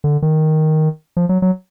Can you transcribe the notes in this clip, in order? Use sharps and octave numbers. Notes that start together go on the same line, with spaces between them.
D3
D#3
F3
F#3
F#3